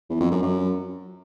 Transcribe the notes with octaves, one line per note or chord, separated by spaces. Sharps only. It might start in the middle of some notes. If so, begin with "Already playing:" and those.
E2
F2
F#2
F#2